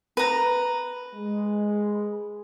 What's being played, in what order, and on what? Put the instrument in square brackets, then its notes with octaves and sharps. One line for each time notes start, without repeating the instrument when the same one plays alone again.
[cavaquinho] B4 A#5
[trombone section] G#3